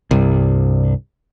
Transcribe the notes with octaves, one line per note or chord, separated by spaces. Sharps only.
C2 G2